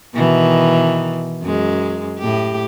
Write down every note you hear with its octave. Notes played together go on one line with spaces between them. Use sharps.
B2 D#3 E3
F#2 G#3
A2 G4